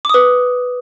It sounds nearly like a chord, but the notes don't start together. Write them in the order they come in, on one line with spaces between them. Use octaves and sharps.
D6 D#6 B4